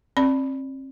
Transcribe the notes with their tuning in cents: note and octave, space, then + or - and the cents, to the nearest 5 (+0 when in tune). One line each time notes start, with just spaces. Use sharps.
C4 +40 D5 +0 B5 +0